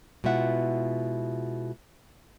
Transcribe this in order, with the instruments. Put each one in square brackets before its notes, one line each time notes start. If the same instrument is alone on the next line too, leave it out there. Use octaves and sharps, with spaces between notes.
[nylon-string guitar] B2 G#3 E4 F4 E5 F#5